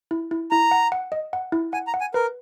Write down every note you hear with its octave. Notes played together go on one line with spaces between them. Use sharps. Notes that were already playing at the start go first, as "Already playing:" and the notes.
E4
E4
E4 A#5
F#5
F#5
D#5
F#5
E4
F#5 G#5
A#5
F#5
G#5
A#4 B4